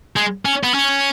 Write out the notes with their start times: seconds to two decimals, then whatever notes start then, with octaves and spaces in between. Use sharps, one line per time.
0.16 G#3
0.45 C#4
0.63 B3
0.74 C#4